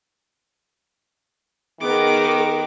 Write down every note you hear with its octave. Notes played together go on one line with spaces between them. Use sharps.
D#3 B3 G#4 A#4 D6